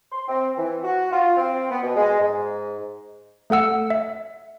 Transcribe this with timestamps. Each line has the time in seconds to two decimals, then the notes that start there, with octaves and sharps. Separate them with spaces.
0.11 C6
0.27 C4
0.57 E3
0.83 F#4
1.11 F4
1.37 C4
1.70 B3
1.83 B2
1.96 G#3
2.20 G#2
3.50 A3 A4 F#5 E6 C#7
3.90 E5